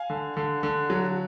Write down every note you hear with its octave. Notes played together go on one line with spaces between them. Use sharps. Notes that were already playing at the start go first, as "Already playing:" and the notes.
Already playing: F5 G#5
D3
D3
D3
F#3